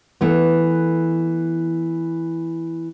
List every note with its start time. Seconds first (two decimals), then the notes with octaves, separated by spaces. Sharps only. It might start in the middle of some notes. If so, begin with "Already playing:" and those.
0.21 E3 A3 B3